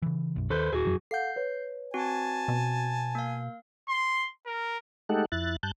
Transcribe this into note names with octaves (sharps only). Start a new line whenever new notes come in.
C#3 E3
B1 F#2
D#2 A4 B4 C5
D#1 F#4 G#4
E1 F#2 F#3
A4 F5 F#5 G6 C7
B4 C#5
C4 F#4 G#5 A5
B2
A#3 F5
C6
A#4
G#3 A3 D#4 G4 A4 F#5
F2 E4 F#6 A6
G2 A5 F#6 G6